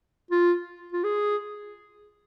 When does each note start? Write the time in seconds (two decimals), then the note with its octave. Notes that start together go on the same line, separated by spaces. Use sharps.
0.31 F4
0.92 F4
1.04 G#4